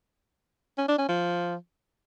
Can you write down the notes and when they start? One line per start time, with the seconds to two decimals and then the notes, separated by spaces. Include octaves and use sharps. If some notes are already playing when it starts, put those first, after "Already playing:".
0.78 C#4
0.88 D4
0.98 C#4
1.09 F3